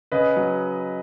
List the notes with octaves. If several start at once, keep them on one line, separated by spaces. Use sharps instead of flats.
C#3 B4 D#5
F#3